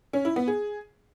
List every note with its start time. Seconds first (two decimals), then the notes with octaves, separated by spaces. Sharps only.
0.13 C#4
0.25 E4
0.36 B3
0.48 G#4